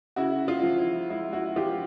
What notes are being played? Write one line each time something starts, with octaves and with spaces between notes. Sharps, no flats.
C#3 E4 F#4
F4
F3
E4
G#3 E4
E4 F#4
F3 F4 G4